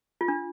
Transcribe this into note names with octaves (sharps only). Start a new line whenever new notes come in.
F4
D4